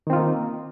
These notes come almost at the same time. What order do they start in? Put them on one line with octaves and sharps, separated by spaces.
D#3 C4 F4 D#4 A#3